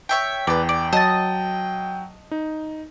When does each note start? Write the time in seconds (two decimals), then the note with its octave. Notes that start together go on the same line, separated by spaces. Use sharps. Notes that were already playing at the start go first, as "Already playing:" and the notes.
0.09 C#5 E5 G5
0.47 E2 B4 D5 G5
0.69 D5
0.93 F#3 D#5 A5 A6
2.31 D#4